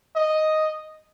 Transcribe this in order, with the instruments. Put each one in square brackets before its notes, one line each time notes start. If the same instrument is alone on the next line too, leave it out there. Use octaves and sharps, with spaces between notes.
[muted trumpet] D#5